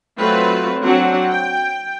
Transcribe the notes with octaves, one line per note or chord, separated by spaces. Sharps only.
F#3 A3 C4 F4 B4
F#3 C4 D4 F#5
G5